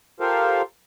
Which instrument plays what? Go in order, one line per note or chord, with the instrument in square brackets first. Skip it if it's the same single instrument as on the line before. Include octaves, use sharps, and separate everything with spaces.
[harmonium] F4 G4 A4 A#4 C5 F5